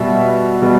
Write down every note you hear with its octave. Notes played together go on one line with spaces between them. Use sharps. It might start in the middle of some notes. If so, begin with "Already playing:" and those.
Already playing: B2 G3 E5
B2 G3